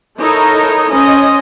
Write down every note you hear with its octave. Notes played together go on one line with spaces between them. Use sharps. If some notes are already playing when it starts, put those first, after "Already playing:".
D#4 E4 A4 A#4 C#5 D#5
C#4 C5 D#5